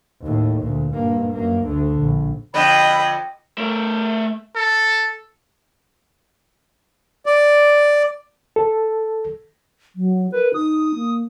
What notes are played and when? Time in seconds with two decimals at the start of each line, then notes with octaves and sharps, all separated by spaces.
0.22 D#2 A2
0.61 D2 A#2
0.92 G2 A#3
1.33 F#2 A#3
1.65 D2 D3
1.99 A#1
2.54 F2 D3 D#5 G5 B5
3.58 A3 A#4
4.55 A4
7.26 D5
8.56 A4
9.96 F#3
10.32 A#4 B4
10.54 D#4 D#6
10.95 A#3